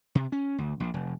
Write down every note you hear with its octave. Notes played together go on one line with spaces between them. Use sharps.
C3
C#4
D2
A#1
F1